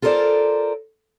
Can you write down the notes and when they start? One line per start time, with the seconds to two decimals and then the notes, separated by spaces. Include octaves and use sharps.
0.02 F4 A4 A#4 C5 D5